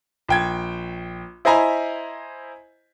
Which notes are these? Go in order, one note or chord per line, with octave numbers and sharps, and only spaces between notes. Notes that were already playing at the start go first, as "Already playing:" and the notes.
A#1 G5 G#6
E4 C5 D#5 G#5 A#5 B5